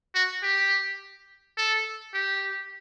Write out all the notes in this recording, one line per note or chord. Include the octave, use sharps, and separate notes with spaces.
F#4
G4
A4
G4